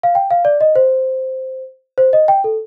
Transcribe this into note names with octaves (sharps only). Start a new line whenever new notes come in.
F5
G5
F5
D5
D#5
C5
C5
D#5
G5
A4